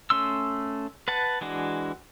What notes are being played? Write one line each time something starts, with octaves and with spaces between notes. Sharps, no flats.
A3 C#4 C6 E6
B4 F#5 A5
E3 G#3 D4 F#4